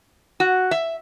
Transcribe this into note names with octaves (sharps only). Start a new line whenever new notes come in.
F#4
E5